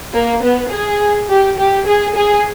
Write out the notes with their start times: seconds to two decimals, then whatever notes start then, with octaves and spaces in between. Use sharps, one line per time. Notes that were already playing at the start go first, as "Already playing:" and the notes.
0.14 A#3
0.43 B3
0.71 G#4
1.29 G4
1.58 G4
1.87 G#4
2.15 G#4